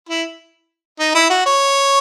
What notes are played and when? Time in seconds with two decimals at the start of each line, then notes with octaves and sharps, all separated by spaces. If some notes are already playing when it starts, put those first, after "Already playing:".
0.09 E4
1.00 D#4
1.15 E4
1.30 F#4
1.46 C#5